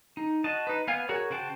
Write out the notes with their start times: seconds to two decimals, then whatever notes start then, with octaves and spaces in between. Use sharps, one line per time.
0.17 D#4
0.44 F#4 D#5 A5
0.67 D#4 B4
0.88 B3 F5 G#5
1.09 F#4 G#4 A#4 C#5
1.30 C#3 F#4 C5 G5 A5